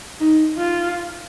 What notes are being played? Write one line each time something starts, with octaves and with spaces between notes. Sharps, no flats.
D#4
F4